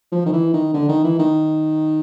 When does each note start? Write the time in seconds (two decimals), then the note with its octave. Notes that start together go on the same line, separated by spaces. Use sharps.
0.12 F3
0.26 D#3
0.33 E3
0.54 D#3
0.74 D3
0.89 D#3
1.04 E3
1.19 D#3